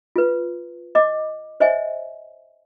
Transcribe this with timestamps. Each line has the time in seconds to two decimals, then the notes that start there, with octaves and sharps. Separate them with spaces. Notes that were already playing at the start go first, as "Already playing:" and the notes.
0.16 F4 B4
0.95 D#5 D6
1.60 C5 C#5 D#5 E5 G#5